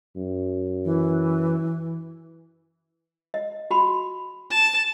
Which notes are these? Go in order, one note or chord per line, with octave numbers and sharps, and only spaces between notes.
F#2
E3
D#5
F#4 B5 C6
A5